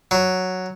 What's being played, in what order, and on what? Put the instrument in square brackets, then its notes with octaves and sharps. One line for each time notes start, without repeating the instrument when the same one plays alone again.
[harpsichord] F#3